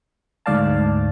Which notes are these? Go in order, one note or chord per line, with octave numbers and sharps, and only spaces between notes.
D2 G#2 D5 F5 A5